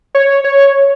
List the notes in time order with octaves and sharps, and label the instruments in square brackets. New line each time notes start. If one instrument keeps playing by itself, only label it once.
[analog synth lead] C#5
C#5